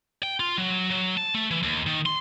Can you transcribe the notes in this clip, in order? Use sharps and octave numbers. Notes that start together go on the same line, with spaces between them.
G5
F4
F#3
F#3
A5
A3
E3
D#2
D#3
C6